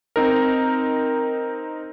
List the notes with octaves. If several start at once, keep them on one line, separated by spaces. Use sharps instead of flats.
C4 D#4 A#4